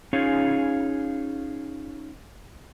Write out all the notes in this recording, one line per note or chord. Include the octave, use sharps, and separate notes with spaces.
C#4 D#4 F4 G#4 C#5 F5